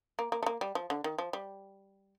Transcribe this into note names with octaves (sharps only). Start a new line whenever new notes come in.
A#3
A#3
A3
A#3
G3
F3
D3
D#3
F3
G3